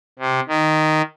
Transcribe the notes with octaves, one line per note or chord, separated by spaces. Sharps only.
C3
D#3